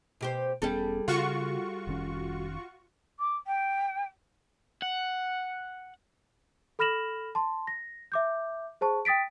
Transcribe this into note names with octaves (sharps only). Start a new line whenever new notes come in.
B2 G4 C5
E1 G3 B3 C#4 G#4 A4
C#3 F4 F#4 C#6
F1 D#3 C#4
D6
G5
F#5
A4 B5 F6 A#6 E7 F#7
A5 C6
A#6
E5 D6 G6
G#4 C5 A5 C#6
G5 D#6 A6 B6 D7